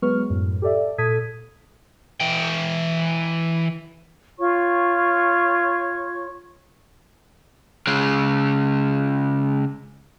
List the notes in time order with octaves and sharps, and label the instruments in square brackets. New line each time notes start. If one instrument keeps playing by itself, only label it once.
[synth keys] F#3 G#3 B3 B4 C#6 F6
F#2 A2
G4 A4 D5 E5
A#2 A4 D#6 G#6 B6 D#7
[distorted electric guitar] E3 G5
[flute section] F4 C#5 C#6
[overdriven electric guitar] C#3 G#3